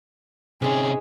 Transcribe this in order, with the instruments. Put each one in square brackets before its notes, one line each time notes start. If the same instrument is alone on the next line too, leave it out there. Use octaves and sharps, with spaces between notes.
[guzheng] G#2 G#3 [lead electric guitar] C3 C#4 [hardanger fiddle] G#4